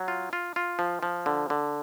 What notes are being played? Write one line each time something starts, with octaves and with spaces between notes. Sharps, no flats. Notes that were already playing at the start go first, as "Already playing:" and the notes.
Already playing: F#3
F4
F4
F4
F3
F3
D3
D3